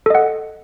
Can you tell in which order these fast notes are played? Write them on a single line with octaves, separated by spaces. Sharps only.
A4 D#5 F#5